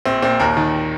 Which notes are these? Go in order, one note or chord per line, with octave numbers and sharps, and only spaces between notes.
A#1 C4
A#2 C4
D#2 A#4
D#3